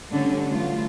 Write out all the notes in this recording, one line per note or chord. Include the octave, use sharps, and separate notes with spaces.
A2 D3 G3 A3 C#4
D3 E3 F#3 A3 F4